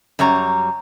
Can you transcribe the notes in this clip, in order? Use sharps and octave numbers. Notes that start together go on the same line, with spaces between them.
F#2 G3 C#5 A#5